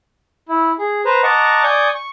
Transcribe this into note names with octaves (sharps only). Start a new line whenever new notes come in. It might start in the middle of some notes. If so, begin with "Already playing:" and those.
E4
G#4
B4 C5 A#5
D#5 F#5 A5 A#5 C#6 D6
D5 G#5 C#6 D#6 G6
C#6